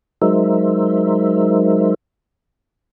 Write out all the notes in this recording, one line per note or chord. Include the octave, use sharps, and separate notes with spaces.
F#3 G#3 D#4 A#4 C5 E5